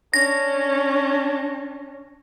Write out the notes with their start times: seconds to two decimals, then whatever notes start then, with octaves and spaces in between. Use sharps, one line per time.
0.14 C#4 D4 A#6